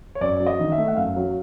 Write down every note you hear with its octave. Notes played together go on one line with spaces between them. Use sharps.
C#5
F#2 D5
F#3
D#5
D#3
E5
A3
F#5
F#2 F5
F#3